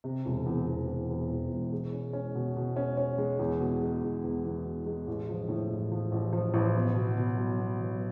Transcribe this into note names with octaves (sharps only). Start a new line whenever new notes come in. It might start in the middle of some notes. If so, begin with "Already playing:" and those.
C3
E1
E2
E2
E2
E2
E1
E1
G#3
C#4
C#4
B2
B2
C#4
C#4
G#3
E2
B2
G#3
E2
E2
E2
B2
G#3
A1
F3
A2
A1
F3
A1
F3
A1
B3
B2
B2
F#3
B3
F#3